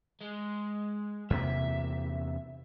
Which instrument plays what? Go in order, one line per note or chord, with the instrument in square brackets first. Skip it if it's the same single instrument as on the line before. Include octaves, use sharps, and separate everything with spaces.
[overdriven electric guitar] G#3
[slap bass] E2 C3 A#3 [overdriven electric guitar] E5